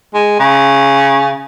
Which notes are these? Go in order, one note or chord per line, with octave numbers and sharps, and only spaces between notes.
G#3
C#3